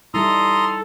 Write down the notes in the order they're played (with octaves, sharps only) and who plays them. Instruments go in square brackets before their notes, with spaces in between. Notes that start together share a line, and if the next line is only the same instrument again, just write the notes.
[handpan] G3 D#4 E4 [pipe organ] A4 [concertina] A#5 C6 D#6